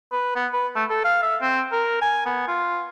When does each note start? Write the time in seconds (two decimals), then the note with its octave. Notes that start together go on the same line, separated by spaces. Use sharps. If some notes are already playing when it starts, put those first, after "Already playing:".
0.12 B4
0.35 B3
0.53 B4
0.75 A3
0.90 A4
1.04 F5
1.22 E5
1.41 C4
1.72 A#4
2.01 G#5
2.25 B3
2.48 F4